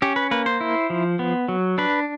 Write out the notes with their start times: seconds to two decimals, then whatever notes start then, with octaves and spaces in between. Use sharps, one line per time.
0.02 C#4 G4
0.16 B4
0.31 A#3 B4
0.46 C5
0.61 E4
0.90 F3
1.19 B3
1.48 F#3
1.78 D4 B4